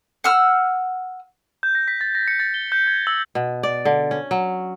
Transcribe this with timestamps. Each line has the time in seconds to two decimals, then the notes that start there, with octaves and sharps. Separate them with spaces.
0.24 F#5 E6 F6
1.63 G6
1.75 A#6
1.88 B6
2.01 A6
2.15 A#6
2.28 C#7
2.40 A6
2.54 G7
2.72 G6
2.87 G#6
3.07 E6
3.35 B2
3.63 D5
3.85 D3
4.11 C#4
4.31 F#3